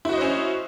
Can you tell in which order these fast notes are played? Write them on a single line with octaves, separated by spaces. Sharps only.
E4 F#4 D#5 C5 C#4